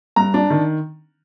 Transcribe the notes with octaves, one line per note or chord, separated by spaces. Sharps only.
G2 A#5
D4
D#3